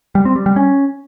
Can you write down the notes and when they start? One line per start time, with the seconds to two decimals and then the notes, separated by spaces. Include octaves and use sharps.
0.15 G3
0.25 C4
0.36 G3
0.46 G3
0.56 C#4